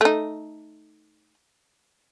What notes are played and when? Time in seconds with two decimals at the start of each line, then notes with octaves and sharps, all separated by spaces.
0.01 A3 D#4